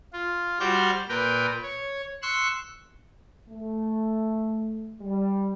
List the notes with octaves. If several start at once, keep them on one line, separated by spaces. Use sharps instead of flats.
F4
G3 F#4 C5 D5 F6 G6
A#2 A#4 B4 G5
C#5
C6 C#6 E6 F#6
A3
G3